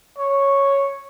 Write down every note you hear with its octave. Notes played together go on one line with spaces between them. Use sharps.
C#5